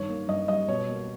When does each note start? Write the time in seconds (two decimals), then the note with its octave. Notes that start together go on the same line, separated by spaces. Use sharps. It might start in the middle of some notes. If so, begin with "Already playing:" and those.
Already playing: G2 D#3 C#5
0.09 A#3
0.28 G2 D#5
0.48 G3 D#5
0.68 B2 C#5
0.89 A#3